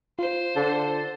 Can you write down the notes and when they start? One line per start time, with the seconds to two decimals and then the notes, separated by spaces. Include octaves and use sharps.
0.19 F4 C5
0.56 D3 A5